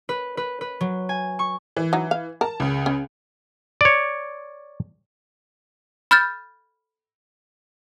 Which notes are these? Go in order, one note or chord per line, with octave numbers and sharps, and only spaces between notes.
B4
B4
B4
F#3
G#5
C#6
E3
F#3 D#4
F5
A#4 A5
C#2 C#3
C#4
C#5 D5
B5 F6 G6 A6